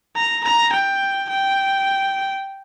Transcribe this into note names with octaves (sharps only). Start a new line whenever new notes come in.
A#5
A#5
G5
G5